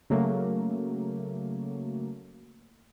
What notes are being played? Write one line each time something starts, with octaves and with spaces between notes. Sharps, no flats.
C#3 F#3 A3 A#3